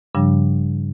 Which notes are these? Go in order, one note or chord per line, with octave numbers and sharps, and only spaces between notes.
G2 C#3 F3 G3 D4